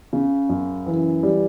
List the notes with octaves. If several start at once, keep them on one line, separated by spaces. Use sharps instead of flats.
C#3
F#2
E3
G3